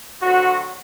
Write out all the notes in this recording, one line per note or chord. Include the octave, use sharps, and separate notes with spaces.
D3 F#3 C4 F#4